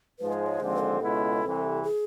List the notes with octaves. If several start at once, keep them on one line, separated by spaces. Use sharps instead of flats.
G#2 F3 G#3 B4
C5
C#5
D#2 D3 F3 G#3 C4 C5
A4
C#2 B2 G#3 B3 E4
C2 C3 E3
G#4